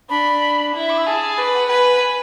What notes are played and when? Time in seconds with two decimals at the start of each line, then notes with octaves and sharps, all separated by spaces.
0.09 D4 B5
0.74 E4
0.82 B5
0.89 D6
0.97 E6
1.05 G#4 A5
1.38 B4 D6
1.54 F#5
1.69 B4 G#5